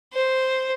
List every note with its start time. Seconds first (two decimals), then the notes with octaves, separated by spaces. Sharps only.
0.13 C5